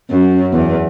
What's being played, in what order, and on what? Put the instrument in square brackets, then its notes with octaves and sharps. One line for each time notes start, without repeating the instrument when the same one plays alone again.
[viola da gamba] F#2
E2